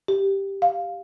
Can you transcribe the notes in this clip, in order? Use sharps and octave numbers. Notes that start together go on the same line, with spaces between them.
G4
F5